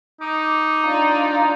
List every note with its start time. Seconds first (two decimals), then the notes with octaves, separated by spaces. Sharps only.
0.21 D#4 D6
0.84 D4 F4 D5 A#5